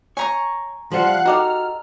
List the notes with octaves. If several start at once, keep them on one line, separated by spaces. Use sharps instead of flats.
C#5 G#5 A#5 C#6
F3 G3 C5 F5 F#5 F#6
D#4 F#4 G4 A4 F6